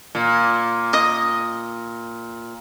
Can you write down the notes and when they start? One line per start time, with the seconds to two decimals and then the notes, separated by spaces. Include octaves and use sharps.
0.15 A#2
0.93 D#5 D#6